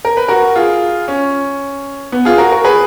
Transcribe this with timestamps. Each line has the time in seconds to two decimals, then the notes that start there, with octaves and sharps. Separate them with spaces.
0.05 A#4
0.17 B4
0.28 F#4 A#4
0.56 F4 G#4
1.08 C#4
2.12 B3
2.25 F4 G#4
2.38 F#4 A#4
2.51 F#4 A#4
2.64 G#4 B4